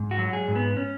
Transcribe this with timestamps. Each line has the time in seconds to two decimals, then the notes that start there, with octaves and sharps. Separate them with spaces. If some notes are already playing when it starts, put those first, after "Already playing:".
Already playing: G#2
0.11 F#4
0.18 F#3
0.33 G#4
0.48 G#2
0.55 B3
0.77 C#4